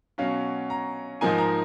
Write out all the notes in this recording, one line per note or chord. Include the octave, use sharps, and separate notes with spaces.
B2 F#3 C#4 F5
A#5
G#2 F3 A#3 D#4 G#5
A#5